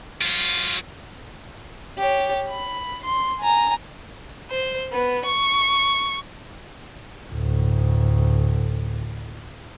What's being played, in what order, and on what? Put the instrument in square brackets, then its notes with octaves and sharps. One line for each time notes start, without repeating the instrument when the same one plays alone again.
[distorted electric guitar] F#3 F4
[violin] G4 C#5
B5
C6
G#5 A#5
C5
B3
C#6
[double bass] D2 A2